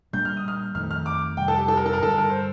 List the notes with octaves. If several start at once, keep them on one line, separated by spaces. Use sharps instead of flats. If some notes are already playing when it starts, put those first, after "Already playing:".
A#2 G3 A#3 D4 G6
F6
D#6
F6
F2 D#3 A3 F6
F6
D6
F2 C3 G3 G5
A4
G4
A4
A#4
A4
A#4
G2 D3 G3 A4
A#4
C5